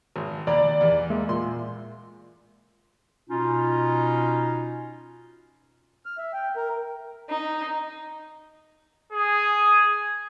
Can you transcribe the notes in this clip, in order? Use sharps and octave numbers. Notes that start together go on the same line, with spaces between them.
G#1
D#2 D5 A#5 B5
E2
G#3 A#3 E5
A#2 C6
B2 C#4 D#4 F4
F6
E5
G5
A#4
D#4
G#4